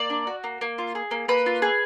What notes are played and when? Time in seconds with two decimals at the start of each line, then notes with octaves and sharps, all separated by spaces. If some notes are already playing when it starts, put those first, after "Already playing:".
Already playing: A#3 D5
0.10 D4
0.27 F#4
0.44 A#3
0.61 A#3
0.78 F4
0.95 G#4
1.11 A#3
1.28 A#3 B4
1.46 F4
1.62 G#4